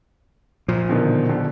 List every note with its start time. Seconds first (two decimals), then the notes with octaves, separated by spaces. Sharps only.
0.68 A#2 F3
0.89 B2 D3 D#3
1.29 B2 D3